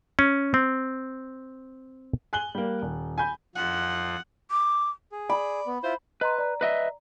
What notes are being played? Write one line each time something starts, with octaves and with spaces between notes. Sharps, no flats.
C#4
C4
G#5 F#6 F#7 G7
G3 A#3
D#1
G#5 B5 G6
F2 F3 F#5
D6
G#4
D5 B5
B3
E4 F4 C5
B4 D#5 A#5 C6
D5 A#5
B4 D#5 E5